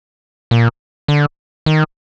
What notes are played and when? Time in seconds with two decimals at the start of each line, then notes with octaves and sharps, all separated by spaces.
0.51 A#2
1.08 D3
1.66 D#3